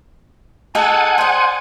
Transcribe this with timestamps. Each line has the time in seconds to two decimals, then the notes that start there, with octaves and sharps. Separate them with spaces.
0.75 D#4 G#4 A4 F#5 G#5 A5
1.18 G#4 C5 D5 G5